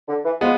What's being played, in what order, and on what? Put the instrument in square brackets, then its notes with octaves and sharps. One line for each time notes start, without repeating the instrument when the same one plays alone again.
[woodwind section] D3
E3
[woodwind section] F3 [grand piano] G#3 B3